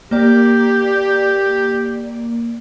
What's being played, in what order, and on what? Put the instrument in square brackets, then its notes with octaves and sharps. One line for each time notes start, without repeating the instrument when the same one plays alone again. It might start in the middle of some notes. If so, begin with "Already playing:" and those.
[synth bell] A#3 D5 [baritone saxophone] G4